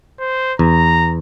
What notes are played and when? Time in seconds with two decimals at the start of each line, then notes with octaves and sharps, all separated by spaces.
0.20 C5
0.59 E2 A#5